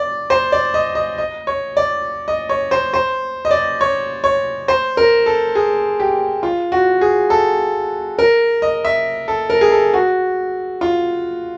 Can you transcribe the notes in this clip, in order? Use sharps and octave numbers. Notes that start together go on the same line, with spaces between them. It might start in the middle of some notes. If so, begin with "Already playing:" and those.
Already playing: D5
C5
D5
D#5
D#5
D#5
C#5
D5
D#5
C#5
C5
C5
D#5
D5
C#5
C#5
C5
A#4
A4
G#4
G4
F4
F#4
G#4
A4
A#4
D#5
E5
A4
A#4
G#4
A4
F#4
F4